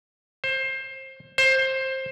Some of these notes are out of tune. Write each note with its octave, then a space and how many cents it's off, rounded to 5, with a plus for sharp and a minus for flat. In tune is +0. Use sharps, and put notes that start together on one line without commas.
C5 +20
C5 +15